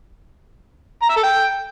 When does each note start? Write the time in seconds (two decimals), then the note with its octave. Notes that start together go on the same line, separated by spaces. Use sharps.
1.02 A#5
1.09 E5
1.16 A4
1.23 G5